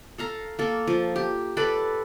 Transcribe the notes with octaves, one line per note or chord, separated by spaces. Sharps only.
A4 F5 A#5
A#3 A4
F3
G4
A4 B4 D5